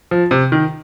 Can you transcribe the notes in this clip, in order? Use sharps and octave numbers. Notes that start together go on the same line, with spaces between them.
F3
C3
D#3